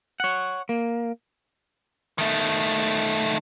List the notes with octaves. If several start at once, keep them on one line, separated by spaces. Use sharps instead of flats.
C#5 F#5
A#3
D#3 A3